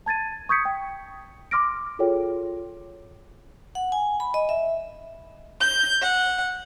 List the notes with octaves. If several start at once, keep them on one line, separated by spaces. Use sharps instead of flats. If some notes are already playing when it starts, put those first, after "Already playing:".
A5 G#6 A6 D#7
C#6 D#6 G6 G#6 B6 C#7
G5
C6 D6 F6 A#6 D7
F4 F#4 G#4 A4 C#5 G5
F#5
G#5
B5
D#5
E5
G6
F#5